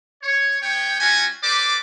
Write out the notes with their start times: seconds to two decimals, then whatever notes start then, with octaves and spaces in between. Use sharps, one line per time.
0.22 C#5
0.62 B3 C#5 G5
1.00 G3 C#4 F4 F#4 G#5
1.43 A4 B4 C5 D5 D6